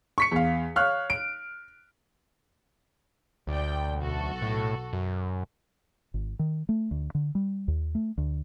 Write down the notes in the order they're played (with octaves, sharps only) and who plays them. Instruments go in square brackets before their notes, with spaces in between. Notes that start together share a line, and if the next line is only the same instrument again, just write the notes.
[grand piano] C#6 B6 C#7
E2 F5
C#5 F5 F6 F#6
D7
[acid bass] D2 [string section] D5 G5
[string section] B1 F#4 A4
[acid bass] A2
F#2
[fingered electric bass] G#1
D#3
A3
D2
D3
G3
D#2
A3
D2